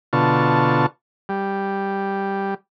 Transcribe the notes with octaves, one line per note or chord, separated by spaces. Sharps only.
B2 D3 F4 A5 C#6
G3